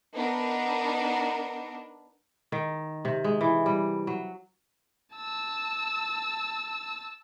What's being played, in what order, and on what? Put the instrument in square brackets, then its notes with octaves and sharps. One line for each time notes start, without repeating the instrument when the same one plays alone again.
[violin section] B3 D4 D#4 A#4
[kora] D#3
C3
G#3
E3
G3
F#3
[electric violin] A5 E6